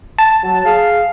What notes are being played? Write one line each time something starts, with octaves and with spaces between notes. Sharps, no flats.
A5
F#3
G#4 F5